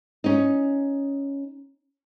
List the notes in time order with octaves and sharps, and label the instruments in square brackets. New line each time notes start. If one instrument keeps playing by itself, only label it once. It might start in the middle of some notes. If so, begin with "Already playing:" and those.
[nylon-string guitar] C#4 D#4